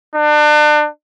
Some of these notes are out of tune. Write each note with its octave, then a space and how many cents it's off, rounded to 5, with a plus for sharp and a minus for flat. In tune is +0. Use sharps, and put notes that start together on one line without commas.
D4 +35